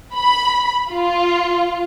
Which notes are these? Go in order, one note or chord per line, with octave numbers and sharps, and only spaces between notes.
B5
F4